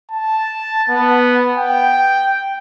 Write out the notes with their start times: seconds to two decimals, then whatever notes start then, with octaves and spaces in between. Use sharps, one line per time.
0.11 A5
0.89 B3
1.58 G5